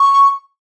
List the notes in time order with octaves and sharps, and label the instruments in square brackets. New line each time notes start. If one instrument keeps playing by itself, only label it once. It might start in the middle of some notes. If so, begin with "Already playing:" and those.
Already playing: [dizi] C#6